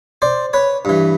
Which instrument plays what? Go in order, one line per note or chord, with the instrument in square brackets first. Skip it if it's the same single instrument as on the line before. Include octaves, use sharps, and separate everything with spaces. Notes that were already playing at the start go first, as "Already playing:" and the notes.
[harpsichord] C5 D5
B4 C#5
G2 E3